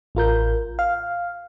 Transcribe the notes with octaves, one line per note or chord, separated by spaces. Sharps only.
A1 F4 A#4 G6
F5